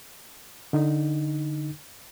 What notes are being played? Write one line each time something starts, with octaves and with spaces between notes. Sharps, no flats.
D3 D#4